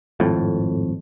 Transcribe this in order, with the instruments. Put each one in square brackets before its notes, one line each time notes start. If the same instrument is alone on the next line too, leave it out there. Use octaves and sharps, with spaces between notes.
[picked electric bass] G#1 F2 A2